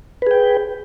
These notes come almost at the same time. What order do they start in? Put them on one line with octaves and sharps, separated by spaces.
B4 G#4 G5